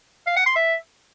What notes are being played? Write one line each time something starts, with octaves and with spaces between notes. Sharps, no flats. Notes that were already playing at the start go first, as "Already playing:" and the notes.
F5
F#5
C6
E5